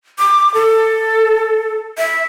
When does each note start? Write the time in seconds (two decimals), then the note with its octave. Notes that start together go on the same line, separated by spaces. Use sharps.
0.18 D6
0.54 A4
1.98 E5